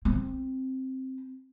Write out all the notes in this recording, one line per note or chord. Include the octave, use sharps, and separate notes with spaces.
C4